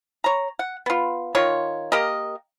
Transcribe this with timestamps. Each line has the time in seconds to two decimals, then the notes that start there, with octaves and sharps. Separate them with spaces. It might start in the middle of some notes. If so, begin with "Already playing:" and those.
0.24 C#5 A#5
0.59 F#5
0.86 B3 F4
1.35 D#3 F4 C#5
1.92 A#3 G4 A#4 D#5